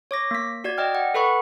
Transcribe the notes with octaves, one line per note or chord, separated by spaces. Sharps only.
C#5 D6 A#6
A#3 B6
F#4 D5 G#6
D5 D#5 G5 F6
F#5
A4 B4 F#5 B5 C#6